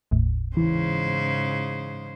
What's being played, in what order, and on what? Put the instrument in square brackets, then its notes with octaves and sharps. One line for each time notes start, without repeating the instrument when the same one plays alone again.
[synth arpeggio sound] G1 D#2 A2
[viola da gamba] G#2 C#3 C5 [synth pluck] E3